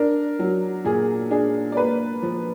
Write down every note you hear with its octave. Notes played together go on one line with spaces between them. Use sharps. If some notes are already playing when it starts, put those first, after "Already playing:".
Already playing: D4 A#4
F#3
A#2 G#4
D4 G#4
D5
A#3 B4
F3